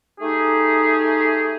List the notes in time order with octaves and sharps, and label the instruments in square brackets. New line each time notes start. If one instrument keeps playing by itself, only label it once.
[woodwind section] A3 D#4 G4 G#4